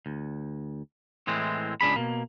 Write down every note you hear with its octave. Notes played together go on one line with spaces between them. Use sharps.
D2
A2 E3 G#3 C4
C#2 D4 G#4 B5
B2 A#3